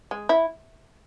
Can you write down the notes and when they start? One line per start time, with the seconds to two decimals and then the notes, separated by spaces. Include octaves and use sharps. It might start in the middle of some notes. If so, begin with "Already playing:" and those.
0.11 G#3
0.29 E4